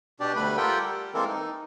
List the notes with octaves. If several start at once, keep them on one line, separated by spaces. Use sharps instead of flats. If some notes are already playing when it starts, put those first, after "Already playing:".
B2 D4 G4 D5
D2 G3 A3 B4 B5
F4 G4 A4 A#4 F#5 G5
G3
E3 G#3 A#3 C4 A4 A#4
D#4